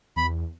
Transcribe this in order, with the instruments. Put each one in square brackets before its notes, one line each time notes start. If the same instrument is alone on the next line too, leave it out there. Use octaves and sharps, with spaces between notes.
[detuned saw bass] E2 [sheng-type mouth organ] B5